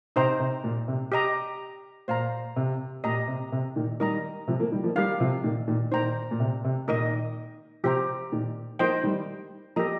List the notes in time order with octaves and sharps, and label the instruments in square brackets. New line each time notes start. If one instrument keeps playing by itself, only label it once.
[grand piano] C3 [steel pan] D#4 C5 G5 A#5
[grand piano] C3
A#2
C3
[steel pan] G4 D#5 A#5
[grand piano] A#2 [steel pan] C5 F5 A#5
[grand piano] C3
[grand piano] A#2 [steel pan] G4 D#5 A#5
[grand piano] C3
C3
A#2 D#3
[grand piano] D#3 G3 [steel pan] A#4 D#5 A#5
[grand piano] C3 F3
F3 A#3
D#3 G3
F3 A#3
[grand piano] D#3 G3 [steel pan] G4 A#4 F5
[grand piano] C3 F3
A#2 D#3
A#2 D#3
[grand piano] A#2 D#3 [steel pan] C5 G5 A#5
[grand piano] A#2
C3
C3
[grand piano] A#2 D#3 [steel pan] D#4 A#4 D#5
[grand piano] C3 F3 [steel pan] G4 C5 G5 A#5
[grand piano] A#2 D#3
[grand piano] F3 A#3 [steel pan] D#4 C5 D#5 G5
[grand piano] D#3 G3
[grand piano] F3 A#3 [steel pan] G4 D#5 A#5